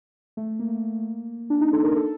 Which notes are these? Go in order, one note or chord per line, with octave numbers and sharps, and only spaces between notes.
A3
A#3
D4
D#4
A4
A#4
A4